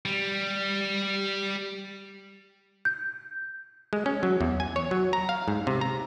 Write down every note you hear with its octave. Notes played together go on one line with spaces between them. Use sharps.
G3
G6
G#3
C#4
F#3
E2
G#5
C#5
F#3
A#5
F5
G#2
C3
A#5